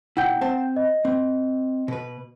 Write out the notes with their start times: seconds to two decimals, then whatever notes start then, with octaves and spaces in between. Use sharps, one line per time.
0.17 B2 E4 F#5 G5 G6
0.41 C4 C5 A5
0.76 D#5
1.05 C4
1.88 B2 B4